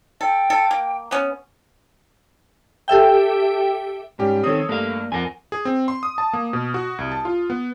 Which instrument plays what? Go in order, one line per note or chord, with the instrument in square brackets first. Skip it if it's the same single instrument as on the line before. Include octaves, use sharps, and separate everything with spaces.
[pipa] A4 [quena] G5
[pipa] A4
A#3
B3 C#4
[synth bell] G4 A4 E5 G5
[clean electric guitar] G#2 [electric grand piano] G3 C#4 G4
[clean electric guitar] D#3 C4 [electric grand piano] A4 C#5 D#6
[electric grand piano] G2 A3 [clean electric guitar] A#3 F5
[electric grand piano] F2 F#5 [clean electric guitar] A#4 G#5
[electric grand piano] G#4
C4
C6
D#6
A5
A#3
B2
F#4
C2
A5
F4
B3